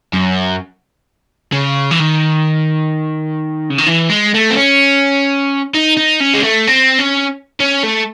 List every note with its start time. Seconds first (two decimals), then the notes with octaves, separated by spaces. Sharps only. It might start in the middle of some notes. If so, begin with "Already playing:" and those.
0.13 F#2
1.53 C#3
1.91 E3
2.00 D#3
3.70 C#3
3.78 D#3
3.86 E3
4.10 G#3
4.34 A3
4.50 C4
4.56 C#4
5.74 D#4
5.97 D#4
6.20 C#4
6.34 G#3
6.43 A3
6.67 C4
6.99 C#4
7.60 C#4
7.84 A3